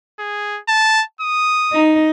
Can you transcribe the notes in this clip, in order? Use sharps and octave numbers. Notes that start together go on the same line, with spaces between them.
G#4
A5
D#6
D#4